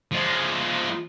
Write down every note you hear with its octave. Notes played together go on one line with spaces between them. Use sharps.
F3 G#3